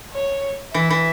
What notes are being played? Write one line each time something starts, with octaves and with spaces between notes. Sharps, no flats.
C#5
E3 E5
E3